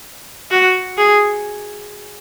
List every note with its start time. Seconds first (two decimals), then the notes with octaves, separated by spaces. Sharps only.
0.51 F#4
0.98 G#4